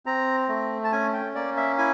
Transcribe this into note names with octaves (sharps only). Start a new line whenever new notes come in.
C4 A#5
A3
A5
C#4 G#5
G5
A#3 D5
E5
E4 G#5